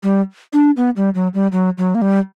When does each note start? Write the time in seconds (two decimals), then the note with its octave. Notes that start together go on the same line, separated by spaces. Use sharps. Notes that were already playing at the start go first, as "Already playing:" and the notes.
0.03 G3
0.53 D4
0.77 B3
0.96 G3
1.15 F#3
1.34 G3
1.52 F#3
1.78 F#3
1.95 A#3
2.02 G3